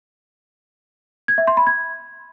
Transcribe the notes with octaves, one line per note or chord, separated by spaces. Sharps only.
G#6
E5
C6
B5
G#6